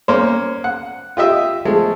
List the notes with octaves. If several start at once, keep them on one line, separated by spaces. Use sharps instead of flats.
A#3 C#4 C5
F#5
F4 G4 D#5 E5
F3 G#3 A3